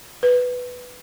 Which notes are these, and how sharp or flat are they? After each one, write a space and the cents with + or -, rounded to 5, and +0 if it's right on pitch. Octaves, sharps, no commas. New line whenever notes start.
B4 +5